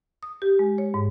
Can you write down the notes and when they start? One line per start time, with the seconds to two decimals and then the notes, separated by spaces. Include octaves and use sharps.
0.23 D#6
0.42 G4
0.59 G#3
0.78 C#5
0.94 G#2